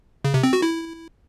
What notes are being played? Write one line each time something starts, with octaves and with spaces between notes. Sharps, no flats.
C#3
C3
C4
F#4
E4